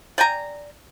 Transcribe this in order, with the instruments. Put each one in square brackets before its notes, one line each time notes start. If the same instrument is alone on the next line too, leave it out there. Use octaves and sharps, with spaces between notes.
[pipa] D5 G5 G#5 A#5